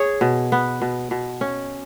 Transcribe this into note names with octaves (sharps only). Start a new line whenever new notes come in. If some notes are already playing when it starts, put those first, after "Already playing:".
Already playing: G#4 C#5
B2
B3
B2
B2
C#4